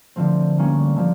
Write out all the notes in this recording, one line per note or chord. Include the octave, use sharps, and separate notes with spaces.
D3 F3 A3 C4
G3 A#3 C#4 F#4
D3 F3